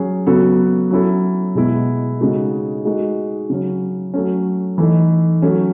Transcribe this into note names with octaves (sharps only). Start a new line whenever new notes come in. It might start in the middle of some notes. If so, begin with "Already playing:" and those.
Already playing: F#3 C#4 G#4
C#3 F#3 B3 F#4 A4
F#3 C#4 E4 A4
B2 G#3 B3 E4
C#3 G#3 D#4 F#4 A4
G#3 D#4 F#4 A4
C#3 F#3 C#4
F#3 A3 C#4
E3 A3 D#4
F#3 A3 C#4